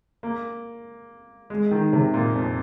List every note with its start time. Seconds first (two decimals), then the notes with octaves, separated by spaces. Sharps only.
0.23 A#3
1.50 G#3
1.71 D#3
1.93 C3
2.14 A#2
2.35 F2